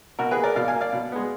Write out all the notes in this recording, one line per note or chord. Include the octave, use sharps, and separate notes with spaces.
B2 F#4 A#4
G#4 B4
A#3
A#4 D5
B2 D5 F5
F5 G#5
A#3
D5 F5
B2
G#3 B3